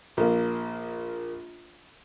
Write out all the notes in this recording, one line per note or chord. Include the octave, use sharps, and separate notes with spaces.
A#1 A#3